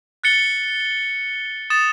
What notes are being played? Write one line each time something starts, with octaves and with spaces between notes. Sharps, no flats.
F#6 A6 C#7 G7
D#6 A6 E7